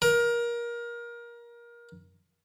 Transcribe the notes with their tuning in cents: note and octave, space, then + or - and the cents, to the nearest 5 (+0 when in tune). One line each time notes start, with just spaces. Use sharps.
A#4 +25